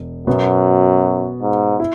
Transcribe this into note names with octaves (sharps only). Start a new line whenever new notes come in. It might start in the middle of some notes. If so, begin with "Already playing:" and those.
Already playing: E1
F#2 B2 B3 F#4
G#2
E4